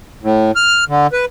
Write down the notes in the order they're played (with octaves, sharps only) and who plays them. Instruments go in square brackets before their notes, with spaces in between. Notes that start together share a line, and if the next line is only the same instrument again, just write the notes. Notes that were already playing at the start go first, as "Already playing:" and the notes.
[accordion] A2
F6
D3
B4